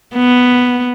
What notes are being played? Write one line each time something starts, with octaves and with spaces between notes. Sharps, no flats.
B3